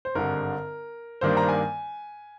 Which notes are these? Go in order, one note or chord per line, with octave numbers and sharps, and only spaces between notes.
C5
G#1 G2 D3 A#4
G2 D#3 G3 A#3 D4 C5
A#5
G#5